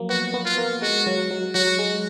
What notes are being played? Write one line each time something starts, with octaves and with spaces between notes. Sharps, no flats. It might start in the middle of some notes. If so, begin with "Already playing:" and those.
Already playing: F3 F#3 A#3
B3 F#4
B3
F4
A#3
G#3 F#4
F#3
F#3
F#3 F#4
G#3